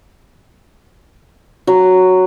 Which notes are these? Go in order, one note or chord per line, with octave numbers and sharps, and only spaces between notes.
F#3